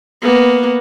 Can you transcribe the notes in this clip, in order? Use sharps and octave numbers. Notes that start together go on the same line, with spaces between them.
A#3 B3